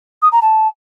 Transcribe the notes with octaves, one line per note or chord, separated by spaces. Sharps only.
D#6
A#5
A5